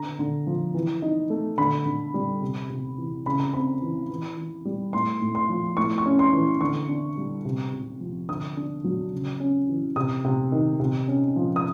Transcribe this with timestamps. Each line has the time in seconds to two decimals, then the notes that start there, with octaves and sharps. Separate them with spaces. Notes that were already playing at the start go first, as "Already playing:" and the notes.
Already playing: D3 A#5
0.19 D3
0.47 F3
0.74 E3
1.02 D#4
1.30 A3
1.58 D3 B5
1.86 D3
2.14 G3
2.42 C3
2.70 C3
2.98 E3
3.26 C#3 B5
3.40 A#5
3.54 C4 B5
3.82 E3
4.10 E3
4.37 E3
4.65 G3
4.93 A2 C6
5.21 A2
5.35 C6
5.49 F3
5.77 A2 C#6
5.98 C#6
6.06 C#4
6.19 C6
6.33 E3
6.61 D3 C#6
6.89 D4
7.17 G3
7.45 C3
7.73 C3
8.00 F3
8.28 D3 D#6
8.57 D4
8.84 F#3
9.13 C#3
9.40 C#4
9.68 E3
9.96 C3 D#6
10.25 C3
10.52 D#3
10.80 C3
11.08 C#4
11.36 F3
11.56 D#6